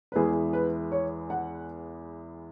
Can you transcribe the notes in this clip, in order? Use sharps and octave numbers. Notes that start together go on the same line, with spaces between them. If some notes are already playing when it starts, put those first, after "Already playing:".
B4
E2 E3 G#3 B3 G#4
B4
C#5
F#5